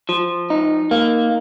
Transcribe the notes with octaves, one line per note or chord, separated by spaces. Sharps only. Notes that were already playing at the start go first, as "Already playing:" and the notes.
F3
D#4
A#3